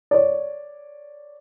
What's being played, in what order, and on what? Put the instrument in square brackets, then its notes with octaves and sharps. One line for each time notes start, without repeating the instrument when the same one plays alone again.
[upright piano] C#5 D5